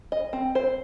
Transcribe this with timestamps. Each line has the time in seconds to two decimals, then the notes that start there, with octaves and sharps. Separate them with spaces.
0.12 D#5
0.33 C4
0.55 C5